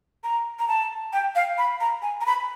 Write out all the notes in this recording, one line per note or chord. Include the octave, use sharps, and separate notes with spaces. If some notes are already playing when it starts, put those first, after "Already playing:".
A#5
A#5
A5
G5
F5
B5
A#5
G#5
A#5
B5